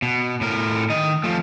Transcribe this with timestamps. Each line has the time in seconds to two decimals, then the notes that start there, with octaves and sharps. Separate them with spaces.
0.02 B2
0.41 A2 A#4
0.90 D#3 D#5
1.24 F3 A3